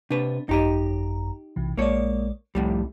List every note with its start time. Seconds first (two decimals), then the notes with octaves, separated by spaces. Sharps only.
0.10 C3 D4 B4
0.49 G#1 F#2 D#4 G4 D#5 A#5
1.56 B1 C3 E3
1.77 A#1 G#3 A#3 C#5 D5
2.55 C2 F2 A2 G3